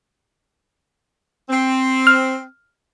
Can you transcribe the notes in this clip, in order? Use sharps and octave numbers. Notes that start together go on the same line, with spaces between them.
C4
F6